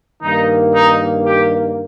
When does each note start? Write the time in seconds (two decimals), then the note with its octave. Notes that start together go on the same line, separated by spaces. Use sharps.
0.22 G2 D#3 A#3 D#4
0.73 D#4
1.25 G4